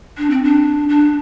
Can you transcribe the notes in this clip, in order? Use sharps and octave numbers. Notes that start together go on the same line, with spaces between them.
D4
C4
D4
D4